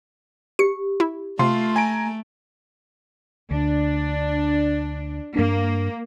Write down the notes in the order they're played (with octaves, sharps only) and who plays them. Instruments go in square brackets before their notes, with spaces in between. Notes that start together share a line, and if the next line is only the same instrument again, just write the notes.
[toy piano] G4 [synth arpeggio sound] C#7
[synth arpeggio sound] E4
[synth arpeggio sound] C3 [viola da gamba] A3 [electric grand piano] F4 C6
[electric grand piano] G#5 A#5 D7
[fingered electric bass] D2 [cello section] D4
[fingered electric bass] G2 D4 [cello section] A#3